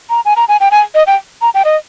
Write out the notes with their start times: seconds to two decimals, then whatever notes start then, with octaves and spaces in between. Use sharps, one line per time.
0.10 A#5
0.25 G#5
0.36 A#5
0.48 G#5
0.60 G5
0.71 G#5
0.95 D#5
1.07 G5
1.42 A#5
1.54 G5
1.65 D#5